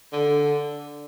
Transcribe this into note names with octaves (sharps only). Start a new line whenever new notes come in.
D3